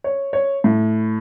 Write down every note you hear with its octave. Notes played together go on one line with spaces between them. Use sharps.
C#5
C#5
A2